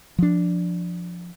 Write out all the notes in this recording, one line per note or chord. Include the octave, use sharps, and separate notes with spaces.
F3 D4